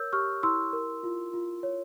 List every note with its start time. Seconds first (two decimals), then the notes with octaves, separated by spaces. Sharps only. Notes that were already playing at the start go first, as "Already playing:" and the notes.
Already playing: A#4 C#5 E6 G6
0.13 G4 C#6 F6
0.43 E4 C6 E6
0.73 A#4
1.03 F4
1.33 F4
1.63 C#5